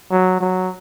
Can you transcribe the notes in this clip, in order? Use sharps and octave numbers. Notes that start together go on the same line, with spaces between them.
F#3
F#3